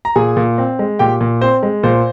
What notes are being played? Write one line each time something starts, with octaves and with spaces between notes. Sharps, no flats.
A#5
A#2 G#4 G#5
A#2
C4
G#3
A#2 G4 G5
A#2
C4 C5
G#3
A#2 C5